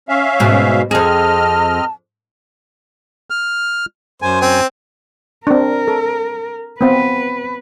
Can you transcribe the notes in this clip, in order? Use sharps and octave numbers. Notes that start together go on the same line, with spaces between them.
C#4 E5 F5
G#2 B2
F2 C4 G#4 D#5 A5 F6
F6
F#2 C5 G#5
C4
C4 D4 A#4
A4
B3 C4 B4 F5